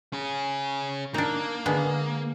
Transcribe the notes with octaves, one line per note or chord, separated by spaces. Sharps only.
C#4 G#4
A#3 D4 D#4
D3 G#3 B3